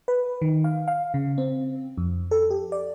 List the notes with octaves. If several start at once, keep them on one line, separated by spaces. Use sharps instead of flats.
B4
D#3
F5
F5
C#3
C4
F2
A4
G4
D5